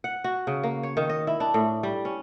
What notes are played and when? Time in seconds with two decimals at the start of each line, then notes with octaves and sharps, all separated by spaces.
0.04 F#5
0.24 F#4
0.47 C#3
0.63 A#3
0.83 C#5
0.97 D#3
1.10 D#5
1.27 E4
1.40 D4
1.54 A2
1.83 G3
2.05 C#4